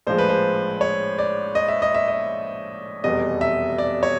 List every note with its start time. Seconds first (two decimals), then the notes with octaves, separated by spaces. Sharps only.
0.07 A#1 A2 F3 G#3 C5
0.18 B4
0.29 C5
0.81 C#5
1.18 D5
1.55 D#5
1.68 E5
1.82 D#5
1.95 E5
2.08 D#5
3.04 F1 E2 B2 G3 D#5
3.41 E5
3.78 D5
4.03 C#5